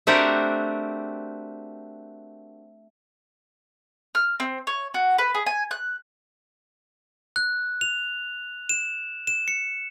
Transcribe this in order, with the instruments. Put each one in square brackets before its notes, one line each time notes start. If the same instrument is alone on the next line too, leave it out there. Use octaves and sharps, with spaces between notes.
[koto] A3 C4 D4 F#4 G4 A#4
[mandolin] F6
C4
C#5
F#4
B4
G#4
G#5
F#6
[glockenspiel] F#6
F7
E7
E7
C#7